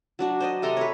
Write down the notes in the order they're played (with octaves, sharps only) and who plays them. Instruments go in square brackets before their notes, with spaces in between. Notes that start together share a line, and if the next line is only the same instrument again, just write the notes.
[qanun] F#3 D4 F#4
C5 D5 D#5
C3 A4 A#5 C6
B4 C#5